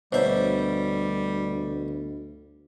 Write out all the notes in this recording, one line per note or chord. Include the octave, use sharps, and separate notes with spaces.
D2 B2 G3 C5 C#5 E5